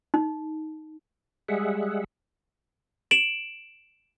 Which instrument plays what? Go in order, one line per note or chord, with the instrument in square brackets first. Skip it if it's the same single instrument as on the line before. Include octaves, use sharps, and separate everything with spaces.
[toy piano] D#4
[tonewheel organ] G3 G#3 G#4 E5 F#5
[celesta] D7 E7 F#7